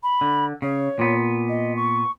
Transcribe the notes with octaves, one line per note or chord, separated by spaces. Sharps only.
B5
D3
C#3 C#5
A#2 B3
D#5
C#6